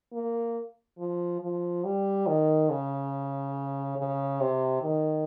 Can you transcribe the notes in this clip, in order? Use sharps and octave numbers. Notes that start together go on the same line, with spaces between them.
A#3
F3
F3
G3
D#3
C#3
C#3
C3
D#3